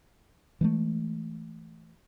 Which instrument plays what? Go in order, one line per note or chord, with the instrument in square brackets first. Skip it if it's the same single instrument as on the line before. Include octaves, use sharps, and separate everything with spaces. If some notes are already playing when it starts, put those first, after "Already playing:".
[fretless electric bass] E3 G#3 A3